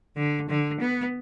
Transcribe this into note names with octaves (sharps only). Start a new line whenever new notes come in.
D3
D3
B3